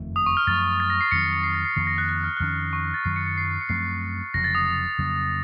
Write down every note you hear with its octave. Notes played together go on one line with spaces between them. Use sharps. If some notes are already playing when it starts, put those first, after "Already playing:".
Already playing: F#1 F2 D#3 A3
D#6
C#6
F6
F#2 F3 A3 A6
A6
A#6
C7
F2 D#3 F#3 C4 C#7
C#7
C7
A#6
C7
F2 D#3 A#3 C7
A#6
F#6
F#6
F6
F#6
F2 D#3 A#3 C#4 F6
C#6
A6
F#2 D#3 F#3 C7
C#7
C#7
C7
C#7
F#2 F3 A3 C4 C7
F1 F2 C#3 F#3 A#6
A6
D#6
F2 C#3 F#3 A#3